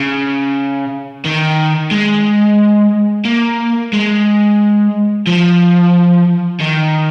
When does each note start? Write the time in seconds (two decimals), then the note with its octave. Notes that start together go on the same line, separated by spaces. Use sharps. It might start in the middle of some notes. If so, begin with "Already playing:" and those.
Already playing: C#3
1.25 D#3
1.91 G#3
3.25 A#3
3.93 G#3
5.27 F3
6.60 D#3